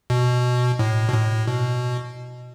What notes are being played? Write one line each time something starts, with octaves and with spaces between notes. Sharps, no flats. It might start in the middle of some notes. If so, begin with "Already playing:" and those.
B2
A2
B2
A2
B2